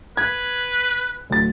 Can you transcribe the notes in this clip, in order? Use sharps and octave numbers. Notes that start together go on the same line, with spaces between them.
B4 G#6
D1 A6